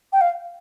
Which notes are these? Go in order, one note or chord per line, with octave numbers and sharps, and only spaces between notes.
G5
F5